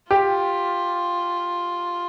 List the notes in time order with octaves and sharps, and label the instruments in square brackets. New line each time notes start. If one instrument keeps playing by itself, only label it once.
[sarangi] F4 [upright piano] G4